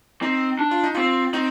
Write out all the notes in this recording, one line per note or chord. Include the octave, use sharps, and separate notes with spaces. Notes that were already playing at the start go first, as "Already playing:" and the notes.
C4 D#4
D4
F4
D#4
C4 F4
C4 D#4